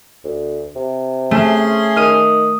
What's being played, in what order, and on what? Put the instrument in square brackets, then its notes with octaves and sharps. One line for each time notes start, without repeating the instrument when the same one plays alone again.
[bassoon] D2
C3
[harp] A3 [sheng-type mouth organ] C#4 G#4 C6
[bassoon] D#3 [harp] D#6 F6